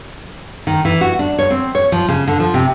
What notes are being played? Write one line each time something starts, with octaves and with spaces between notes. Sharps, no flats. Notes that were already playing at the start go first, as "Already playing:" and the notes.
D#3
E3
F#4
D4
C#5
C4
C#5
F3
C#3
D3
F3
C3